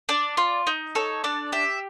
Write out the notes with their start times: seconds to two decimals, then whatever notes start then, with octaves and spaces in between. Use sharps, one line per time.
0.09 D4 D5
0.37 F4
0.67 D#4
0.95 A4 C#5
1.24 D4 D5
1.52 G4 E5